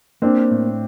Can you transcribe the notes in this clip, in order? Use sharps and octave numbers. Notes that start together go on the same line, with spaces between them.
A#3 C4 D4
A2